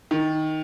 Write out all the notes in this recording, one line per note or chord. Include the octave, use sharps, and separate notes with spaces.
D#3